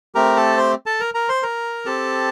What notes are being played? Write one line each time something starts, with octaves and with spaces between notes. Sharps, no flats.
A3 C4 G4 A#4 A#5
A4 A5
C5 C6
A4 A5
A#4 A#5
A#4 A#5
C5 C6
A#4 A#5
C4 G4 A4 A5